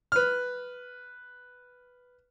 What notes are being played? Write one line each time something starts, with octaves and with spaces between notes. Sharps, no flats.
B4 F6